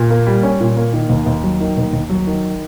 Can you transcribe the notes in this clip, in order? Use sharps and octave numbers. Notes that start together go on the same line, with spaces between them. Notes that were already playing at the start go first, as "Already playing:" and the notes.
Already playing: A#2
A#3
G3
C#4
A#2
A#3
D#3
D#2
D#2
F#3
D#3
D#2
D#2
F#3
D#3